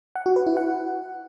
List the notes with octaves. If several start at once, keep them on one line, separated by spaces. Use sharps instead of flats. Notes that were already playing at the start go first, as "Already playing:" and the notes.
F#5
F#4
B4
E4
F#5